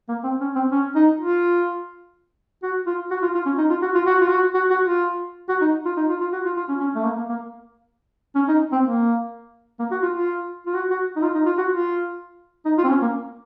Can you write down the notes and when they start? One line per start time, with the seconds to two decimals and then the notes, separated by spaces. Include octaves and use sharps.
0.09 A#3
0.24 C4
0.41 C#4
0.56 C4
0.72 C#4
0.95 D#4
1.20 F4
2.63 F#4
2.86 F4
3.11 F#4
3.22 F4
3.35 F4
3.46 C#4
3.58 D#4
3.70 F4
3.82 F#4
3.95 F4
4.06 F#4
4.21 F4
4.30 F#4
4.54 F#4
4.70 F#4
4.85 F4
5.49 F#4
5.61 D#4
5.86 F4
5.97 D#4
6.10 F4
6.21 F4
6.33 F#4
6.46 F4
6.57 F4
6.69 C#4
6.80 C#4
6.95 A3
7.05 A#3
7.16 A#3
7.29 A#3
8.35 C#4
8.48 D#4
8.72 C4
8.84 A#3
9.79 A#3
9.91 F#4
10.02 F4
10.15 F4
10.67 F4
10.75 F#4
10.91 F#4
11.16 D#4
11.22 F4
11.35 D#4
11.46 F4
11.58 F#4
11.70 F4
12.65 D#4
12.78 F4
12.84 C4
12.89 C#4
13.02 A#3